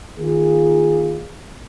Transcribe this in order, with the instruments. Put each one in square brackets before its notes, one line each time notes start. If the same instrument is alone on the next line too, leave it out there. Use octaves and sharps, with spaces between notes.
[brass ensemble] D#3 A#3 F4 G#4